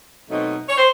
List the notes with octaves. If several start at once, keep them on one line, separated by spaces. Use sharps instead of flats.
B2 F#3 A3 C4 D#4
C#5
C5